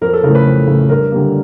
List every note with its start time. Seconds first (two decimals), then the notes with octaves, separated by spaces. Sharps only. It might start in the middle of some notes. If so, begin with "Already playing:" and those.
0.01 F2 A#4
0.13 A4
0.23 C#3 E3 A3 A#4
0.35 B4
0.45 F2
0.67 C#3 E3 A3
0.89 G2 A#4
1.12 D3 G3 A#3